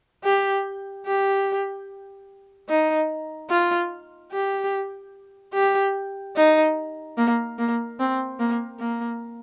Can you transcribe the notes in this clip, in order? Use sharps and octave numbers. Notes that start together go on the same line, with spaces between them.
G4
G4
D#4
F4
G4
G4
D#4
A#3
A#3
C4
A#3
A#3